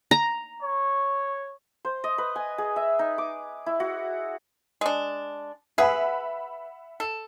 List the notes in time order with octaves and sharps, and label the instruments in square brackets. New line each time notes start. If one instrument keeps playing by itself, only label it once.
[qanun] A#5
[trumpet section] C#5
[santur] C5
D#5
B4
G#5
G#4
E5
D#4
D6
E4
F#4
[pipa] G#3 D4
[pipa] G#4 B4 [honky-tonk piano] E5 F#5 B5
[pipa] A4